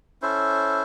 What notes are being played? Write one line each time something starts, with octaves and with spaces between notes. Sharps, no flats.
C#4 E4 A4 C5